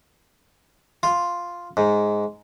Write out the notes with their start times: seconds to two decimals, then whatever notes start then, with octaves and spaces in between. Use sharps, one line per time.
1.03 F4
1.77 G#2